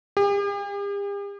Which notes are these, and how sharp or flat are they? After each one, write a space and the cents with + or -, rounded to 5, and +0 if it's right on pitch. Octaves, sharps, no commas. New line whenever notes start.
G4 +45